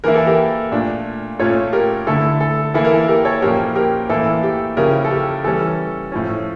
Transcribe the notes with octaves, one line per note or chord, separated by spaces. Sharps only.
E3 A#3 E4 A#4
A4
G4 A#4
A#2 A3 D4
A#2 A3 C#4 F4 A4 C#5
G4 A#4
D3 A3 E4 A4
A4
E3 A#3 E4 A4
A#4
A4
G4 A#4
A4 C#5
A#2 F3 A#3 C#4 E4 G4 A#4
G4 A#4
A2 E3 A#3 E4 A4
G4
C#3 F3 C#4 E4 G4 A#4
A4
G4
E3 G3 C#4 A4
A2 F3 C#4